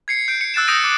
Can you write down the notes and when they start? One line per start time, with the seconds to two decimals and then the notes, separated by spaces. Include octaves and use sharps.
0.08 G#6 C7 C#7
0.28 G6 D7
0.41 C#7
0.54 E6 F#6 A6 D7 E7
0.68 D#6 E6 G6 A#6 D7 D#7
0.84 D6